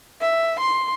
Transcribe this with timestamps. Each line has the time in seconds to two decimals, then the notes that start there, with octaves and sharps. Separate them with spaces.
0.21 E5
0.60 C6